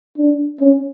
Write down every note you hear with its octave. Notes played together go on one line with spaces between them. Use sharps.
D4
C#4